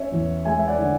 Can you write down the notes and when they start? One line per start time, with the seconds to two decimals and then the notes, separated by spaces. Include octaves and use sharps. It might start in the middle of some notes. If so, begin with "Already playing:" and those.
Already playing: C#4 C#5 E5
0.12 E2
0.45 G#3 E5 G#5
0.58 E5
0.67 D5 F#5
0.79 D3